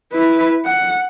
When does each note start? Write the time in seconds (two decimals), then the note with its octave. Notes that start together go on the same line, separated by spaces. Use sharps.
0.13 E4 B4
0.65 F#5